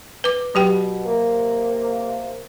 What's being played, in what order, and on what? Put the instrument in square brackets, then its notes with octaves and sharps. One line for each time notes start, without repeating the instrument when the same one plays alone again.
[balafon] B4 D6
[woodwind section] B2 [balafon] F#3 G4 G5
[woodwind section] C3 A#3